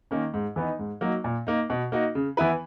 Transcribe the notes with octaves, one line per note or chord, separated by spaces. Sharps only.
D#3 A#3 C#4
G#2
E3 B3 D#4
G#2
F#3 A#3 D#4
A#2
A#3 D#4
B2
A#3 D#4 F#4
C#3
E3 B3 E4 B4